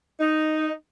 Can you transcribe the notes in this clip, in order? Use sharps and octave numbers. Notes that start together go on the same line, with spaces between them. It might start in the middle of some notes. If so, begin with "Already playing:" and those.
D#4